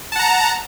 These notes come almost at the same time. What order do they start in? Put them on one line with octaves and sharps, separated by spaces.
A5 F#5 A#5